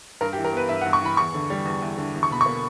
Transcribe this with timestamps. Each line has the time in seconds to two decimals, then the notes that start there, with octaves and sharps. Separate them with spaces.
0.21 G2 A#4
0.33 G4
0.37 E3
0.44 A#4
0.53 B3 B4
0.69 G2 E5
0.81 F#5
0.85 G2
0.93 C#6
1.01 E3 B5
1.17 E2 C#6
1.34 D3
1.50 G3
1.65 E2
1.82 E2
1.98 D3
2.15 E2
2.23 C#6
2.31 B2 B5
2.41 C#6
2.46 A#3